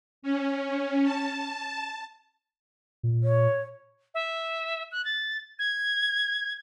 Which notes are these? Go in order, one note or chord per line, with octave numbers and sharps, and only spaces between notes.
C#4
A5
A#2
C#5
E5
F#6
A6
G#6